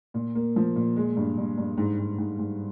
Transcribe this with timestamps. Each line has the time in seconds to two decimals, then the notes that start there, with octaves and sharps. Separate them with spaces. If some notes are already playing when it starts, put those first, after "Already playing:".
0.14 A#2
0.35 A#3
0.56 F3
0.76 A#2
0.97 G#3
1.17 G2
1.38 G2
1.58 G2
1.77 G#2
1.99 G#2
2.18 G#2
2.39 G#2